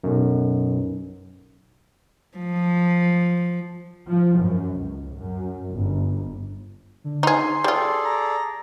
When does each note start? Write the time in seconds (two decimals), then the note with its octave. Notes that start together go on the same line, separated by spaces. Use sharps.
0.04 B1 F#2
2.37 F3
4.09 F3
4.40 F#2
4.76 C#2
5.16 F#2
5.70 G1
7.04 D3
7.23 D#4 G#4 C6
7.64 G3 F4 G#4 A4 D5
8.05 A#5